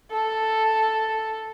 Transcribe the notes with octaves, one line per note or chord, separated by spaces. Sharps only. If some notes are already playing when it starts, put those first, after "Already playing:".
A4